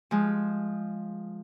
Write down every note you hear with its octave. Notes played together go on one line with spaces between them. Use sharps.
F3 G#3